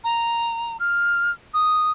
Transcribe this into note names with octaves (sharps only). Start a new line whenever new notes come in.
A#5
F6
D#6